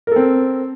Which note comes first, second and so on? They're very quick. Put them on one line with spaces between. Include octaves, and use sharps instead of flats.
A#4 A4 C4